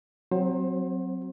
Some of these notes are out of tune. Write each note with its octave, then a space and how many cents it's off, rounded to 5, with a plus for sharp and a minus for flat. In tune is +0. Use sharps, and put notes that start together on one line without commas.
F#3 +0 C4 -5 C5 +30